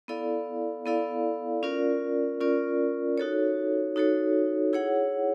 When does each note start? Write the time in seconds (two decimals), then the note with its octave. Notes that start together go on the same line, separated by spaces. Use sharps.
0.08 B3 E4 A4 D5 F5
0.85 B3 E4 A4 D5 F5
1.63 C#4 F4 A#4 D5
2.41 C#4 F4 A#4 D5
3.18 D#4 F#4 A4 C#5
3.96 D#4 F#4 A4 C#5
4.73 E4 G#4 C#5 F#5